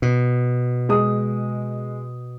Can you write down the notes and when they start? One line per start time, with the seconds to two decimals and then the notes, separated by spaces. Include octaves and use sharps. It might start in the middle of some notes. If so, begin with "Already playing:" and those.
0.02 B2
0.89 G#3 D#6